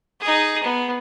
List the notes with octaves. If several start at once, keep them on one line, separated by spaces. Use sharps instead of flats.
D#4 G#4
B3